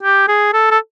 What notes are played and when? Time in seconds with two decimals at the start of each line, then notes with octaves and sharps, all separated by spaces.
0.03 G4
0.28 G#4
0.53 A4
0.71 A4